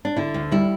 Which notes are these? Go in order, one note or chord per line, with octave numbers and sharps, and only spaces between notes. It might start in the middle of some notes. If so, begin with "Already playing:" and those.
D4
D3 E4
D2
G3 E4